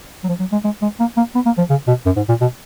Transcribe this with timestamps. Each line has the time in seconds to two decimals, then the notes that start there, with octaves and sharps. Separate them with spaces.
0.24 F#3
0.29 F3
0.40 F#3
0.52 G#3
0.64 G#3
0.82 G#3
1.00 A#3
1.17 A#3
1.35 B3
1.46 A#3
1.58 F3
1.70 C#3
1.87 B2
2.06 F#2
2.16 G#2
2.29 A#2
2.41 B2